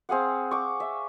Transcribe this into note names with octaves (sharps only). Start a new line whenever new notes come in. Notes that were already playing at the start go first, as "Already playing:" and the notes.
C4 G#4 F5 F#5
C#6 D6
E5